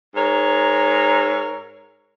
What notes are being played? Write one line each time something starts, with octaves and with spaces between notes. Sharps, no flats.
G#2 A#4 C#5